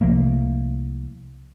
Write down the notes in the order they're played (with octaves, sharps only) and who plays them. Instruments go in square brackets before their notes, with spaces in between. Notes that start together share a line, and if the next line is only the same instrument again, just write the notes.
[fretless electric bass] C2 F3 A3 A#3